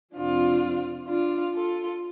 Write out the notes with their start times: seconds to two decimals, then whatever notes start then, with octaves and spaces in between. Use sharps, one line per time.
0.14 F2 C3 F3 D4 F4
1.08 D4 F4
1.54 F4 A4